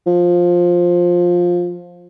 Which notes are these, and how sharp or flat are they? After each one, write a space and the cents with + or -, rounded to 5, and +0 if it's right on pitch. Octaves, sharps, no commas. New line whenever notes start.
F3 +10